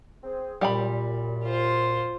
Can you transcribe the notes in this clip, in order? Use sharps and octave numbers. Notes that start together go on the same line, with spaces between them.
C4 G#4
F#2 A#2 G3 G5 B5
F4 C5